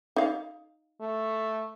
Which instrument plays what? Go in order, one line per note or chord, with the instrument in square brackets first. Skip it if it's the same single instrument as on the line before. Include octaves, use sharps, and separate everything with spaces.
[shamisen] D#4 F5
[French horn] A3